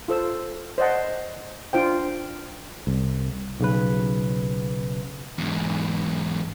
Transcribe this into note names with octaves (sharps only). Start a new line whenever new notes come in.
F4 A4 C5 E6
C5 D5 D#5 F#5 A5
D4 F4 C5 G5
C2
B1 C#3 B4
E2 G#2